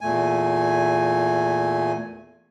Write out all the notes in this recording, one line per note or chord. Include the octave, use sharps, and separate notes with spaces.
E2 A#2 A3 G#5